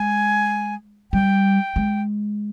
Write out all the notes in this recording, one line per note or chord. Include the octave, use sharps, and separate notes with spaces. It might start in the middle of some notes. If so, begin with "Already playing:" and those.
Already playing: G#3 G#5
G3 G5
G#3